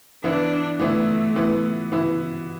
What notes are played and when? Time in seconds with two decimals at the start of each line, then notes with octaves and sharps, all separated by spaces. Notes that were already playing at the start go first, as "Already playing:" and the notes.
0.24 E3 B3 D4 E4
0.79 E3 A3 B3 E4
1.35 E3 B3 E4
1.92 E3 B3 E4